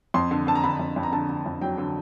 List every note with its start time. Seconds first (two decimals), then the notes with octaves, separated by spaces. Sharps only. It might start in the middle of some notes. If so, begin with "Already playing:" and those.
0.14 F2 C6
0.31 D3
0.47 D3 A5
0.55 A#5
0.64 D3 B5
0.79 F2
0.96 F2
1.03 A#5
1.12 D3 A5
1.29 D3
1.46 F2
1.61 F#3 G5
1.78 D3